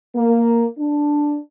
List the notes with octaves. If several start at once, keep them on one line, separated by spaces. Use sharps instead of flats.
A#3
D4